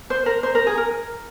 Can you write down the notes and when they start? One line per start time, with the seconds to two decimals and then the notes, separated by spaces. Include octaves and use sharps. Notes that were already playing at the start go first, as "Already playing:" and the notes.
0.10 C5
0.26 A#4
0.43 C5
0.55 A#4
0.67 G#4
0.78 A#4